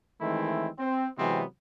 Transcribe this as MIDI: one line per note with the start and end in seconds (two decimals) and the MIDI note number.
0.21 0.69 51
0.21 0.69 52
0.21 0.69 56
0.21 0.69 57
0.21 0.69 60
0.21 0.69 64
0.79 1.07 60
1.18 1.44 48
1.18 1.44 52
1.18 1.44 54
1.18 1.44 56
1.18 1.44 59
1.18 1.44 60